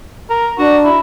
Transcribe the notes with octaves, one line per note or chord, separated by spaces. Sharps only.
A#4
D4 F#4
E4